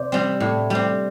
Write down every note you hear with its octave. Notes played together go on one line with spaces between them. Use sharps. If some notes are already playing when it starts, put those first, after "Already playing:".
Already playing: C3 C5 D5
G3 C4
A2
G3 C4